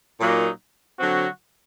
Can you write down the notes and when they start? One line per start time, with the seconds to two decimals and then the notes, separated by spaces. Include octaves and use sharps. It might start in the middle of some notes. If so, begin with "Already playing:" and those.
0.20 A#2 F#3 A#3 D#4
0.98 D3 F#3 C4 F#4